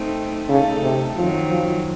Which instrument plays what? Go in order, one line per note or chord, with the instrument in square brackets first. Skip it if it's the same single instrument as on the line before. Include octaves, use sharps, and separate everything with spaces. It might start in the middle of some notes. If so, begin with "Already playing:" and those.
Already playing: [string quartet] A3 C4 D#4
[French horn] C#3 [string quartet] A3 D#4 A4
[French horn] C3
[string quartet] F#2 D#3 F#3 C4 D#4 [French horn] F3
[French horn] F3